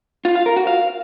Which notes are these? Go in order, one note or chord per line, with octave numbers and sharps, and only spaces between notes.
F4
F5
A#4
F#4
F5